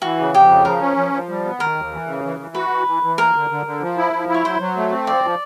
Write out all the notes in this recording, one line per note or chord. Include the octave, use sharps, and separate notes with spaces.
E3 F#4
C#3
F2 G4
C#3
F3 A#4
C#4
F3
F3
G3
B3
D#3 A#4
D#2
E3
C#3
E3
E3
F#4 B4
E3
E3
E3
A#3 A#4
D3
D3
D3
F3
E4
F3
E4
C#5
F#3 C5
F#3
A3
C4
F3 D5
F3